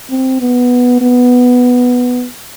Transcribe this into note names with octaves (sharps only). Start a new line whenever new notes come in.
C4
B3
B3